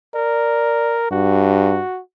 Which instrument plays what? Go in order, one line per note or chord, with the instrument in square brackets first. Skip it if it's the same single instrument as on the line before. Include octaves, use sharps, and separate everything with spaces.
[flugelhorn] A#4 [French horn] D5
[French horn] G2 [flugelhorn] F#4